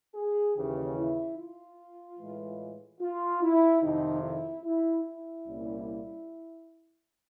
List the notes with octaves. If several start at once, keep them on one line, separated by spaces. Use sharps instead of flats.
G#4
D#2 C#3 E3 G4
E4
F4
A2 E3 G#3
F4
E4
F2 C3 D#3 D#4
E4
E4
E4
C2 A#2 G3 A#3 C#4